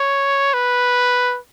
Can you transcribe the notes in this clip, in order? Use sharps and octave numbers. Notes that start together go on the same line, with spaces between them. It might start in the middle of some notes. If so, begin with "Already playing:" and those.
Already playing: C#5
B4